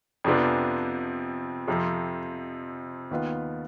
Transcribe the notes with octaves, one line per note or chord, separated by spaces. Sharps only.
F2 C3 F3 B3 D4
F2 C3 F3
D#2 D#3 B3 F4